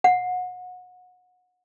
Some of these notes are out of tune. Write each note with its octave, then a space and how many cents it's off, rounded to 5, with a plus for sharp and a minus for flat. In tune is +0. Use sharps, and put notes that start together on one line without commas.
F#5 -30